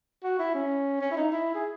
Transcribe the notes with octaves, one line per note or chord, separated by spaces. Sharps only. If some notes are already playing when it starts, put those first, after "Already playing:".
F#4
E4
C#4
C#4
E4
D#4
E4
G#4